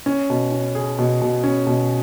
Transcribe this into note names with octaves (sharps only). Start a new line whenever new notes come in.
C#4
B2
C#4
G#4
B2
B2
C#4
B2